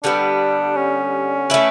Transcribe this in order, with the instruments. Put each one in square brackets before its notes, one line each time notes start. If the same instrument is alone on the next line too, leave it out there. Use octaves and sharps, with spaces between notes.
[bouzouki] D3 G3 B3 [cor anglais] D4
[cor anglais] C#4
[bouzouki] A3 E4 B4